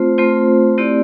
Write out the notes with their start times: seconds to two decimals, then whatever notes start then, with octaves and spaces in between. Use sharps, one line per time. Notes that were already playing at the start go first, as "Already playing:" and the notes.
Already playing: A3 C4 F4 C5
0.18 A3 C4 F4 C5
0.78 A3 C4 E4 G4 D5